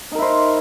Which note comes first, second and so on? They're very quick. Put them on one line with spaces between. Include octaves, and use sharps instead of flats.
D#4 A#4 E4 C5